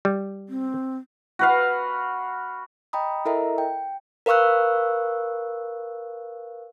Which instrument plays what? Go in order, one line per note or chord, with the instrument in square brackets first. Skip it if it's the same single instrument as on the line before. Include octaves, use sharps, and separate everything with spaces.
[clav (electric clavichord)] G3
[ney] C4
[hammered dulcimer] F#4 B4 F5
[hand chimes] D#5 G5 A#5 B5 D#6
E4 A4 A#4 D#5 E5 A#5
G5
A#4 B4 F5 C#6 E6 F#6